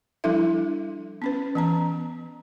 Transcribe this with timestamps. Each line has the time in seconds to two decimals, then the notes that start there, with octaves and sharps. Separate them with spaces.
0.24 F3 G3 D4 E4 A4 E5
1.22 B3 C#4 B4
1.55 E3 B3 A#5